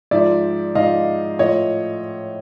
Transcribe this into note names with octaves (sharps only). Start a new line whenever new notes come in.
G#2 F3 D5 E5
G#2 F3 D#5 F5
A2 F3 C#5 D#5